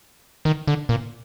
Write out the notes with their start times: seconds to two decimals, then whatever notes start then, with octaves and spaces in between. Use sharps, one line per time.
0.45 D#3
0.68 D3
0.89 A#2